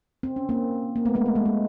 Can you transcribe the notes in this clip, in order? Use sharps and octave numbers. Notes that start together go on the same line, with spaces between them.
C4
C#4
A#3 C4
A#3
A3 B3
G#3 A#3
A3
G#3
G#3